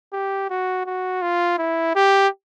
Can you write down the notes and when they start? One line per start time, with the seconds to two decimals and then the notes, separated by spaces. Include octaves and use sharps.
0.13 G4
0.50 F#4
0.86 F#4
1.22 F4
1.58 E4
1.95 G4